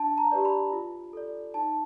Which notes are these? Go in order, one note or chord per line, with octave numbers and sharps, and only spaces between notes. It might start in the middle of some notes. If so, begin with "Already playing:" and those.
Already playing: D4 A5
A#5
G4 B4 D5
B5
F4
A4 D5
D#4 A5